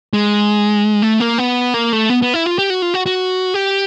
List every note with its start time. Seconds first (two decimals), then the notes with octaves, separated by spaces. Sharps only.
0.13 G#3
1.02 A3
1.20 A#3
1.38 B3
1.74 A#3
1.93 A3
2.10 B3
2.22 B3
2.34 E4
2.46 F4
2.59 G4
2.70 F#4
2.82 F4
2.94 F#4
3.06 F#4
3.54 G4